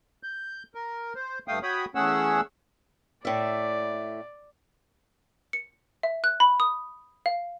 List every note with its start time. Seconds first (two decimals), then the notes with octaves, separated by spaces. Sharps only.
0.23 G6
0.75 A#4
1.15 C5
1.48 G2 A3 F5 G5 D#6
1.63 F#4 C#5 G5 B5 D#6
1.95 E2 A3 C#4 G#4 F#5 E6
3.25 A2 D5 E5
5.53 C#7
6.03 E5
6.24 F#6
6.40 B5
6.60 D#6
7.26 F5